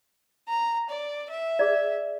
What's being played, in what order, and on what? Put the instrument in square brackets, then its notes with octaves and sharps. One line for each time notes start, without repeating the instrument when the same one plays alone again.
[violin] A#5
D5
E5
[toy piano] G#4 D5